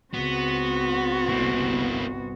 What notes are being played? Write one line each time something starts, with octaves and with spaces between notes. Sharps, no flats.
C#2 B3 C4 F#4
G1 C2 A#3 B3 E4